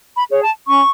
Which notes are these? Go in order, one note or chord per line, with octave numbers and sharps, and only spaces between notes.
B5
G#4 C#5
A5
C#4 C#6